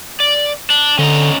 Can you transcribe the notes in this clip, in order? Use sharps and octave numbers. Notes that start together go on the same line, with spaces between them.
D5
D4
D3 C#4 D#5 A#5